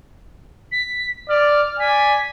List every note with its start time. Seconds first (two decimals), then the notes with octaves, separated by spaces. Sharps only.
0.71 B6
1.28 D5 F6
1.79 D5 G#5 B6